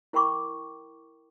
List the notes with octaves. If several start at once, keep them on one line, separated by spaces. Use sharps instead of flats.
E4 A#4 G5 B5 C#6 D6